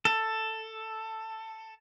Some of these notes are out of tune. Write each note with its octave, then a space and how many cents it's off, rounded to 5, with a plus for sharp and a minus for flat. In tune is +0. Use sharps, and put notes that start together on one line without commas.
A4 +10